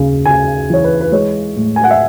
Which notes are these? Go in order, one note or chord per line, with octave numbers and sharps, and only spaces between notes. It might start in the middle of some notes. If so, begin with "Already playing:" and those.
Already playing: D#2 C#3
C#3 G#5
E3 C#5
B4
B4
G#3 C#5
A2
G#5
F#5
E5